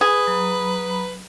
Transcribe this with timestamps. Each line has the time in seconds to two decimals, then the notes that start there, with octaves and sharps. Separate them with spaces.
0.01 G#4 B4
0.27 F#3 A#5 B5